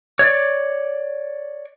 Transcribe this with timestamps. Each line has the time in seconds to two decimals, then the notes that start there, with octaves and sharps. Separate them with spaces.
0.19 C#5 D5